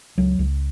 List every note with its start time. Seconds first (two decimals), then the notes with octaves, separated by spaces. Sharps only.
0.18 C#2 F#3
0.39 C#2